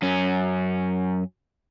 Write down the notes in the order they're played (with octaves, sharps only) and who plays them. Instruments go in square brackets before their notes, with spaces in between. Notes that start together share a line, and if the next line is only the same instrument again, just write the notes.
[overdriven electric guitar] F#2 C#4